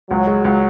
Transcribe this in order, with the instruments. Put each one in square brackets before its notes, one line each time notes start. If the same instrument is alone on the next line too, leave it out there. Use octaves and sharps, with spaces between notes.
[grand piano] C#2 [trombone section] F#3
[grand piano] G#3
C#2